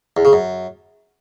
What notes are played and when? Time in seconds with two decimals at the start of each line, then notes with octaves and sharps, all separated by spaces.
0.17 E2
0.25 C#3
0.33 F#2